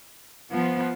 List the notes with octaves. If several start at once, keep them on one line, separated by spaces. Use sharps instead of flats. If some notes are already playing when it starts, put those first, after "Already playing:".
F3 B3